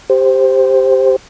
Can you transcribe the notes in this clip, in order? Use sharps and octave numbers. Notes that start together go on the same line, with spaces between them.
G4 C5